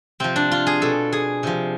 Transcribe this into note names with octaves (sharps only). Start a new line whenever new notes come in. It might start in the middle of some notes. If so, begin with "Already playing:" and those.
C3 F3 C4
D4
F4
G#4
B2 A4
G#4
C3 F3